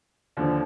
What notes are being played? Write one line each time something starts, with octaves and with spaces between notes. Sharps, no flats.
D#2 D3 F3